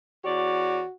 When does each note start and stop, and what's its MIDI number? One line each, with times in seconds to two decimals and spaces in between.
0.25 0.82 40
0.25 0.93 66
0.25 0.82 73
0.25 0.82 74